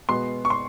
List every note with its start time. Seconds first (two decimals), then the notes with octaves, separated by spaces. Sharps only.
0.09 B2 G#3 B3 C6
0.45 C#6
0.50 C6